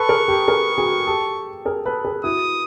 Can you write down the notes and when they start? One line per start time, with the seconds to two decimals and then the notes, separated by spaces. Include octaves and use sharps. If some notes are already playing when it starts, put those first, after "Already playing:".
Already playing: A4 B4 C#6
0.09 G#4 A#4
0.28 G4 A4
0.48 G#4 A#4
0.78 F#4 G#4
1.07 G4 A4
1.65 G#4 A#4
1.85 A4 B4
2.05 G#4 A#4
2.24 E4 F#4 D#6